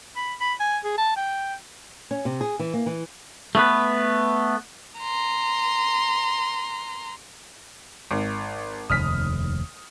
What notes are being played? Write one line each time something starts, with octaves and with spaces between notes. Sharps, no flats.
B5
B5
G#5
G#4
A5
G5
C#4
C3
G#4
E3
A#3
E3
A3 B3 B4
A#5 C6
G#1
F1 D#2 D#6 F6 B6